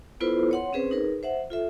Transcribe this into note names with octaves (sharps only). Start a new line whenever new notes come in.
B3 E4 F4 A4 B4 C5
C#5 F#5 C6
C4 C#4 G#4 B4 C5
D#4 G#4 A#4 B4
C5 E5 F#5
F4 A4 E5